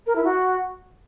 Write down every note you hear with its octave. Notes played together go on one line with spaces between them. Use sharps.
A#4
E4
F#4